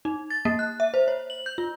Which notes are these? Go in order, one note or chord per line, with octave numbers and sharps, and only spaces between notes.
D#4
A6
A#3
F#6
E5
C5
C#5
F#7
G6
F4